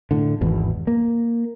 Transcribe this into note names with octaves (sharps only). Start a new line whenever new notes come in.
A2 D3
G#1 E2 B2
A#3